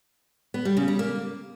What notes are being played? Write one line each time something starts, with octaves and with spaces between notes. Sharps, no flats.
B3
G3
C#3
G3
A#3